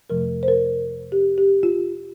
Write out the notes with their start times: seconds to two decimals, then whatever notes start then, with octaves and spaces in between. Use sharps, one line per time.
0.10 F2 C3 F3 A3 A#4
0.43 C5
0.48 A#4
1.12 G4
1.38 G4
1.63 F4